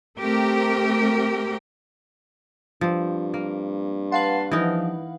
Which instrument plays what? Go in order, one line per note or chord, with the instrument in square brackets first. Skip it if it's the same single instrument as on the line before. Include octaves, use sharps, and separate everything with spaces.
[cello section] A3 C4 G4 A#4
[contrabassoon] G2 [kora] F3 C4
[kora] A#3
[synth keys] B4 F5 F#5 [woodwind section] A5 C6
[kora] E3 D#4 A#4 [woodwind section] F3